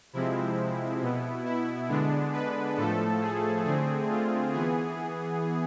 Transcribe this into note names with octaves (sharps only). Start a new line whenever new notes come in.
C3 F3 G#3 C4 E4
B2 B3
E4
D3 G#3 B3 D4
B4
A2 F3 A3 A4
G#4
D3 A3 C4 G#4
F4
E3 B3 G#4